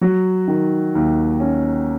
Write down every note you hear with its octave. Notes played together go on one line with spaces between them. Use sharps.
F#3 F#4
D#3
D#2
C#4